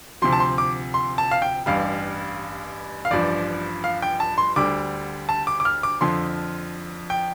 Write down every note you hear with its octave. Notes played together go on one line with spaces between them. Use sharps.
D2 C3 F3 C6
A5
C6
D6
C6
A5
F5
G5
A1 G2 G3 F5
F5
A1 G2 F3 D5
F5
G5
A5
C6
D2 D3 G3 D6
A5
D6
D6
F6
D6
F2 D3 F3 C6
G5